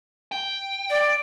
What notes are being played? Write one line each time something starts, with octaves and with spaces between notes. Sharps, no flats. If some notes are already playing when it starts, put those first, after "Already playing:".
G5
D5